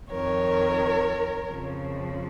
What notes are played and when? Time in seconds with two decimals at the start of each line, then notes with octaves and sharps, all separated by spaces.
0.10 F2 D#3 A#4 C#5
1.47 F2 C#3 F3